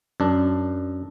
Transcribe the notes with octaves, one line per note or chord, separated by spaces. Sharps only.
F#2 D4